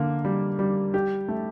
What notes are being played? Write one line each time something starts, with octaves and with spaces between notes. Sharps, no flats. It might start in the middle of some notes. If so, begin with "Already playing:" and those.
Already playing: D3 A#3
G3
G3
G4
A3